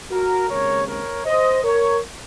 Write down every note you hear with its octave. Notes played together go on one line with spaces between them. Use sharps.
F#4 A#4
D#2 C#3 G#3 C4 A#4 C#5
A#4 C#5
C5 D#5
A#4 C#5